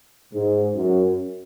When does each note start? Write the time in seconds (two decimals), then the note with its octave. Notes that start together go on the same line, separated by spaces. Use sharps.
0.33 G#2
0.76 F#2